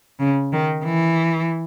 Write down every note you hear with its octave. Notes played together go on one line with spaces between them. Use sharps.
C#3
D#3
E3